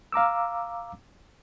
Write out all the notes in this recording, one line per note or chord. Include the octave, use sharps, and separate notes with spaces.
F5 A#5 D6 E6